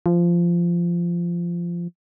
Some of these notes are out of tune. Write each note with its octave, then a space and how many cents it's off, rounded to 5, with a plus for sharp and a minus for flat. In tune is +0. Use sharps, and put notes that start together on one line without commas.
F3 -15